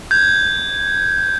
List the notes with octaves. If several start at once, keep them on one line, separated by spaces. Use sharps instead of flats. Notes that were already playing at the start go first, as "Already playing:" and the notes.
G6 G#6